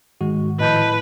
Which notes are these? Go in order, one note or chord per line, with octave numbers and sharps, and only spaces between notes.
G#2 D#3 G#3 F#4
A2 F3 B4 D#5 A5 G6